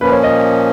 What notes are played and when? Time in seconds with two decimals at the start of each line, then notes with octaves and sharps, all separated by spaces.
0.01 A#2 F3 A#3 C#4 B4
0.12 C#5
0.24 D#5